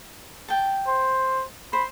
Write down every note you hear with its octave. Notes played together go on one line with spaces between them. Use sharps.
G5 A5
C5
C5 B5